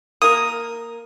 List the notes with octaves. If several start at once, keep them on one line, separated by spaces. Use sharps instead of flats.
A#3 A#4 D#6